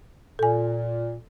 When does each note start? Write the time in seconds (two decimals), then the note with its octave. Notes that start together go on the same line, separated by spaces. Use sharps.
0.39 A#2 A4 G#5